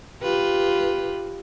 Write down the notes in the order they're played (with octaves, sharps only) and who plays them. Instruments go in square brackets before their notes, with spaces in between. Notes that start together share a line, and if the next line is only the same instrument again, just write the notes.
[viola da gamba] F4 G4 B4